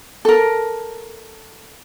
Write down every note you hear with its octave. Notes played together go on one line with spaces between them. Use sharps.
A4 A#4